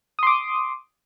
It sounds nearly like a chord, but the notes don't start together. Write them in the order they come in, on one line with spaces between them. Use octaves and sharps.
D#6 C6 D6